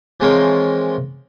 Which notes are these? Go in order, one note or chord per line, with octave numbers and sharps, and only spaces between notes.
E3 F3 G#3 C4 A#4 C#5